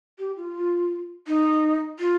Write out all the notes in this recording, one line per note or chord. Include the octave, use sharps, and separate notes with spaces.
G4
F4
D#4
F4